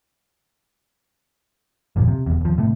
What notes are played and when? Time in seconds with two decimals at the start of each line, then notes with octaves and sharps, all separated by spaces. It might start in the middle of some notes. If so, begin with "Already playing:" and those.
1.96 F#1 D#2 A#2 F3
2.08 C3
2.26 E1 E2
2.41 D#2 F3
2.58 A2 C3 A3